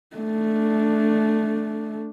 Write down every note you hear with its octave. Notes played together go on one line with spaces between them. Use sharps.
A3 D4